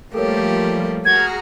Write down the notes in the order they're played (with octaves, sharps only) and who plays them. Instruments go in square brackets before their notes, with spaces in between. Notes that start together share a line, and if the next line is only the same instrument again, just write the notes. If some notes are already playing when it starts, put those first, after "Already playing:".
[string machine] F3 G3 [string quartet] A3 A#3 G4 [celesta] A4 A#4 C#5
[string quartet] F#4 [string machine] G#4 A#5 F6 [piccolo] G#6